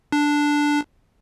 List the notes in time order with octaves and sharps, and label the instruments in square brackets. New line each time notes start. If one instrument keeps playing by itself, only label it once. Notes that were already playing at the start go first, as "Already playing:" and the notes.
[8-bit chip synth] D4